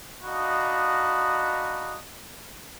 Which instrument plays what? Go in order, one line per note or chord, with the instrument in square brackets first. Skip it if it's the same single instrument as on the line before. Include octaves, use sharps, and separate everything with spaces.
[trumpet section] D4 D#4 F#4 D#5 F5 B5